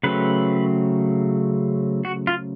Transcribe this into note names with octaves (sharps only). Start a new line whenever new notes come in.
C#3 F#3 A3 C4 B4
F#4
F4